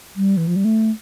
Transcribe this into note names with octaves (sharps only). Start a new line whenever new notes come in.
G3
E3
F3
G3
A3